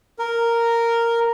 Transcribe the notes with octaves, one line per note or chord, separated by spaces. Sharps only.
A#4